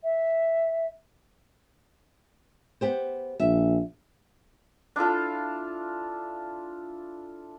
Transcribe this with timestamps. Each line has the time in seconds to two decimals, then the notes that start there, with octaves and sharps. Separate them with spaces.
0.03 E5
2.81 B3 G4 C5
3.40 A#1 E5
4.96 D4 E4 F4 A4